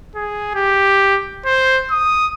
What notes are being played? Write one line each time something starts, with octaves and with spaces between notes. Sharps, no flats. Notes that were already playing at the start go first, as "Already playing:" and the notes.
G#4
G4
C5
D#6